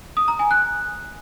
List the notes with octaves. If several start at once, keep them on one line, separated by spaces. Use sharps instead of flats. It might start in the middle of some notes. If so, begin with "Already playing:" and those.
D#6
A#5
G#5
F#6